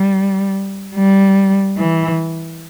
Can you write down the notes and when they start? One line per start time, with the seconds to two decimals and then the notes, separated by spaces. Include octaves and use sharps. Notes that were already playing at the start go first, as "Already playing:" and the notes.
Already playing: G3
0.95 G3
1.78 E3